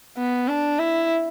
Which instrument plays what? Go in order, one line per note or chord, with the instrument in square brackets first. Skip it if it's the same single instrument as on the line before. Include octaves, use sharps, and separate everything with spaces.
[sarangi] B3
D4
E4